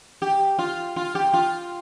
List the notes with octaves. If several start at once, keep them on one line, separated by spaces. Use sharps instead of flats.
G4
F4
F4
G4
F4